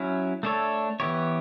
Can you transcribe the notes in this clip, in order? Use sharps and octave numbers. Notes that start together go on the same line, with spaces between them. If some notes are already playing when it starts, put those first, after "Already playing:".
Already playing: F#3 C#4 E4
A3 D4 A4 C#5
E3 B3 E4 G4 C#5